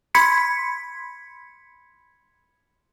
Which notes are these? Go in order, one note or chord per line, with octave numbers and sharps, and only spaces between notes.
B5 C6 G#6 B6 C#7